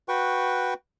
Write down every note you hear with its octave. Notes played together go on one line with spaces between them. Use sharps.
F#4 B4 G5 C#6